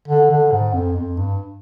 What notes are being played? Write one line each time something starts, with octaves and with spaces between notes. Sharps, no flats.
D3
D3
G#2
F2
F2
G2